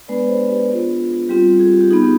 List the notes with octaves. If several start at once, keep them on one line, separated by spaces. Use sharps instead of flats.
G#3 B3 D4 B4 D5
G#4 C5
G4 B4
B3 D4 F4 G#4
G3 C4 F4 G4
G#4
G4
G4
B3 D#4 G#4
G4